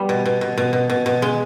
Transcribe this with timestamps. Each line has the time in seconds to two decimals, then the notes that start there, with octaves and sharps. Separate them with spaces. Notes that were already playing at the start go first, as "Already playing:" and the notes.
Already playing: G3 B3
0.09 B2
0.25 B2
0.41 B2
0.58 B2
0.73 B2
0.90 B2
1.06 B2
1.22 G#3